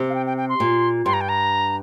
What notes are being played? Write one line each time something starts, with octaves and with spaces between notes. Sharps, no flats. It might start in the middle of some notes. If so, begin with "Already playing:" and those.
Already playing: C3
F5
G5
G5
G5
C6
A#2
G2 C6
A#5
G5
A#5